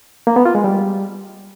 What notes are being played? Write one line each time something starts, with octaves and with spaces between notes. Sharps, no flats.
A#3
B3
F4
G#3
G3